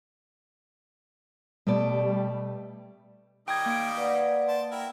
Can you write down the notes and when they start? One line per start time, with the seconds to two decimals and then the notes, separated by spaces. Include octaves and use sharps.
1.67 B2 G3 A3 D5
3.48 D#3 G3 D#5 G5 D#6 G#6
3.66 A#3 D7
3.97 B4 D5 F#5
4.48 C5 A5
4.71 E4 A#4 G5